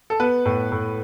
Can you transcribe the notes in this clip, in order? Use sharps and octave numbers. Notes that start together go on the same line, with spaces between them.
A4
B3 B4
A2
A2